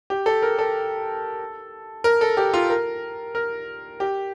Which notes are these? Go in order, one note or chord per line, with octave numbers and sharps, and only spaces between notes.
G4
A4
A#4
A4
A#4
A4
G4
F4
A#4
A#4
G4